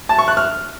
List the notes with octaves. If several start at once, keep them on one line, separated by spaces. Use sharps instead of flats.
A5
C#6
F#6
F6